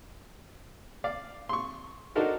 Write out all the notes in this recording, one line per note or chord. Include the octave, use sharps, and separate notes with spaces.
D5 F5
C6 C#6
D4 D#4 F#4 A4 A#4 C5